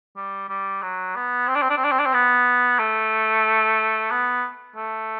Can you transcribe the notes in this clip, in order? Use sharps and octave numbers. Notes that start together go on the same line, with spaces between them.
G3
G3
F#3
B3
C4
D4
C4
D4
C4
D4
C4
D4
C4
B3
A3
B3
A3